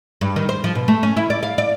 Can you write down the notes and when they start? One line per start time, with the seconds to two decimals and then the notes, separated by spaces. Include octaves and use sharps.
0.21 G2
0.36 D#3
0.49 C5
0.64 F3
0.75 B2
0.88 A3
1.03 C#4
1.17 E4
1.30 D5
1.43 F5
1.58 D5